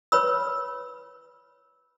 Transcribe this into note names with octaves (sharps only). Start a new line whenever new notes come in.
B4 C#5 B5 E6